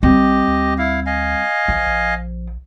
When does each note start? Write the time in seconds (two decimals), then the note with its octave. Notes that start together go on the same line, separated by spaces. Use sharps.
0.03 A#1 G3 C4 G4 D#5
0.48 D2
0.78 E4 F5
1.06 D#5 F5 G#5
1.68 A#1 F3
1.87 A#1